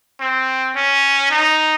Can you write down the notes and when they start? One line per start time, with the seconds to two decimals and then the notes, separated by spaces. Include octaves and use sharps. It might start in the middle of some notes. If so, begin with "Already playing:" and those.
0.20 C4
0.76 C#4
1.31 D#4